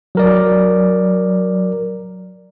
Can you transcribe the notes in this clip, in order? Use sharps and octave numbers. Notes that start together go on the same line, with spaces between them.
F#3 A#4 D5